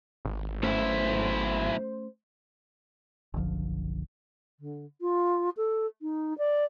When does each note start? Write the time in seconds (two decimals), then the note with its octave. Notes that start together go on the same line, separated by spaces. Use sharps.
0.25 G#1
0.63 B1 A3 C#4 E4 C5
3.34 F#1 B1 D3 F3
4.59 D3
5.01 F4
5.57 A4
6.02 D#4
6.38 D5